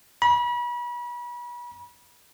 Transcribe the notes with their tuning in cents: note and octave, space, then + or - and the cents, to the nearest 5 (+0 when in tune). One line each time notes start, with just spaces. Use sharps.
B5 -35